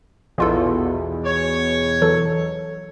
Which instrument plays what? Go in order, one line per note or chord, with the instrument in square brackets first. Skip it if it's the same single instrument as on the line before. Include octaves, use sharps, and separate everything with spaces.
[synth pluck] A#1 F4 A4 [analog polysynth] E2 B2
[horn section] C#5
[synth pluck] E3 F#3 A4